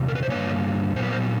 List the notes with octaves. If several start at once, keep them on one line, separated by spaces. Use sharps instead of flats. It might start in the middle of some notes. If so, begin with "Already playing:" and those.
Already playing: E2 C3
A#4
B4
C5
G2 D3 F3 A#3 B4 C#5
A#2 F#3 B3 C5
B4
A#4 C5